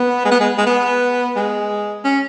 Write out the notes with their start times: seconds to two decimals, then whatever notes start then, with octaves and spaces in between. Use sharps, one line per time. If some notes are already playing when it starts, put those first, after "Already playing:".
Already playing: B3
0.25 G#3
0.31 B3
0.40 G#3
0.58 G#3
0.66 B3
1.36 G#3
2.04 C#4